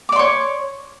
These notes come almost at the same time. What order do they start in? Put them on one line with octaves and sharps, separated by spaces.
D6 D5 C6 C#5